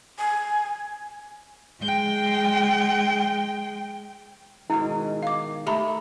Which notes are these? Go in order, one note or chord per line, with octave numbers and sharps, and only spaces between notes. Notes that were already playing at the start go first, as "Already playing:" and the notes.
G#5
G#3 G5
G#2 B2 D#3 G#3 E4
F5 D6
A3 G4 A#5 B5